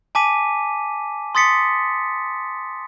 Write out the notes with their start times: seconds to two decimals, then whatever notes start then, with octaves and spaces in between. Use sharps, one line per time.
0.15 G#5 A5 D6 B6 D#7
1.35 C6 D#6 A6 B6 C#7